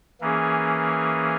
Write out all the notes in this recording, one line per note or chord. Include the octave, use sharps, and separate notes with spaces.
E3 A#3 C#4 G#4